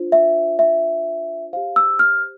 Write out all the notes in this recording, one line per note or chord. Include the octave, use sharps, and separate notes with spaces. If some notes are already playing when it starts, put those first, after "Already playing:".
Already playing: D4 F4 C5
E5
E5
G4 C5 F5
E6
F6